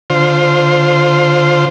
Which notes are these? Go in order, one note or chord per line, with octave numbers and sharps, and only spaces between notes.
D3 F4 C5